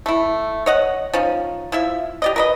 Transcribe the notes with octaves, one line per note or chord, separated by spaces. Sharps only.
A3 E4
C#5 D#5 F#5
F3 C#4 D#4
F3 E4 E5
G4 D5 D#5
A#4 B4 D#5